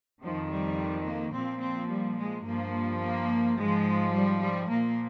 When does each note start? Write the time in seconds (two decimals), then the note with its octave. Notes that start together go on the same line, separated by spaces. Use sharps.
0.22 F2 D#3 F3
0.49 G3
1.05 A#3
1.33 A#2 F3 C4
1.62 C4
1.90 G3
2.17 G#3
2.45 G2 F3 A#3
3.01 A#3
3.57 G#2 F3 G#3
4.13 G3
4.41 G3
4.70 A#2 F3 A#3